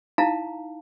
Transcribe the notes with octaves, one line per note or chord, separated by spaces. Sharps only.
D#4 E4 F5 A5 A#5